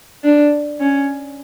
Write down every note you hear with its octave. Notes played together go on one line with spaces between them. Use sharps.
D4
C#4